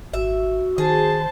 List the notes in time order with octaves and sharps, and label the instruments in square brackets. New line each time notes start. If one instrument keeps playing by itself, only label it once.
[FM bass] G#1 [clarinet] F#4 [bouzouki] E5
[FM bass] D#3 [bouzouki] G#4 [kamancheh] C5 A5